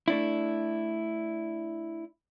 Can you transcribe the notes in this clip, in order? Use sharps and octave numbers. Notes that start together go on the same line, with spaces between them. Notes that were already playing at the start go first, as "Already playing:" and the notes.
A3 D4 E4